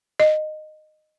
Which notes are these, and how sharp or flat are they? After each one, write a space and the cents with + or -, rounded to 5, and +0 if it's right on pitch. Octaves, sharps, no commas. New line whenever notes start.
D#5 -15